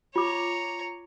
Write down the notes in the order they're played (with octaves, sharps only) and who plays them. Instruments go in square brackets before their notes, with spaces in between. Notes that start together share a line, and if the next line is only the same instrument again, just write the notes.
[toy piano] F4 D6 [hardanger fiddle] C#5 A#5